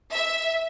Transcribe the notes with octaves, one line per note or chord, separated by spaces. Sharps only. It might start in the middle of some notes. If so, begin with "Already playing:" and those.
E5